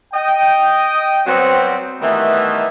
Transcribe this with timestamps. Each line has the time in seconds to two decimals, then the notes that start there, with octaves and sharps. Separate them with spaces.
0.14 D#5 G5
1.26 F#3 G3 B3 C4
2.01 D#3 E3 G3 A3 B3 D#4